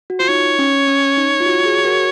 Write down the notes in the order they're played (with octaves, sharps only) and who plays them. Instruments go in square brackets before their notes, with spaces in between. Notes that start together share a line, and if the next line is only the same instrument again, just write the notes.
[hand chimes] F#4
[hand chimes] F4 [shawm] C5
[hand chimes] D#4 [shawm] C#5
[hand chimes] C#4
C#4
D#4
F4
F#4
G#4
F#4 A#4